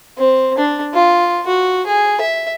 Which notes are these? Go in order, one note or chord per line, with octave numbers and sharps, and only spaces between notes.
C4
D4
F4
F#4
G#4
E5